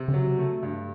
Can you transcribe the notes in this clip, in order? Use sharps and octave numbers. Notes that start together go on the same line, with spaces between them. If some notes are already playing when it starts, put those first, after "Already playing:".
Already playing: C3
D3
C#3 F#3
A3
G2